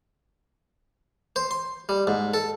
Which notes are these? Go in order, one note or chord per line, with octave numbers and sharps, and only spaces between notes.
C5
C6
G3
G#2
A4